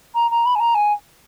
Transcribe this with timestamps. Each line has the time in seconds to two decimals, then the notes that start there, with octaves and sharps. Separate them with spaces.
0.15 A#5
0.31 A#5
0.46 B5
0.55 G#5
0.60 A#5
0.75 G#5